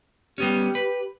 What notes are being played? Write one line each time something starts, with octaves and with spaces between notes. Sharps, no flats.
G3 B3 C#4 G4
B4